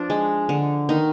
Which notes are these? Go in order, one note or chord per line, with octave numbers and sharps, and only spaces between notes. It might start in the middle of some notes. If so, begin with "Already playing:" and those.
Already playing: F3 D4
G#3
D3
D#3 D#4